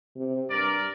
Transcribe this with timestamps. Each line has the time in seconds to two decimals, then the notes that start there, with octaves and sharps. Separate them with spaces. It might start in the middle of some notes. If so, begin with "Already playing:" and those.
0.16 C3
0.51 G2 A#4 D5